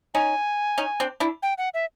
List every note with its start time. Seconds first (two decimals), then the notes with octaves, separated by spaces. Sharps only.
0.14 C#4 D#4 G#5
0.78 C#4 D#4
1.00 C4 D4
1.20 D4 E4
1.43 G5
1.58 F#5
1.74 E5